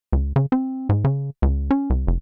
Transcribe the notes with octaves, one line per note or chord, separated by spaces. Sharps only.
C#2
C#3
C4
G#2
C#3
C#2
C#4
C2
F1